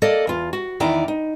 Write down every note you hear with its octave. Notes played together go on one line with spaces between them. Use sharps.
A#3 A4 D5 D#5
E2 F4
F#4
E2 D#3 E4 D5 A#5
D#4